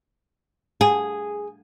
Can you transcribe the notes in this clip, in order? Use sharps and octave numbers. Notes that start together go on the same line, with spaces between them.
G#4